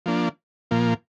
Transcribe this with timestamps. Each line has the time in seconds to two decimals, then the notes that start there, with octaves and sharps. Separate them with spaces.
0.06 F3 A#3 D4
0.71 A#2 F3 A#3